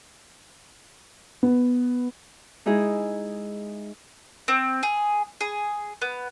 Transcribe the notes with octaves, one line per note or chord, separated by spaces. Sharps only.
B3
G#3 D#4 E4 G#4
C4
G#4
G#4
B3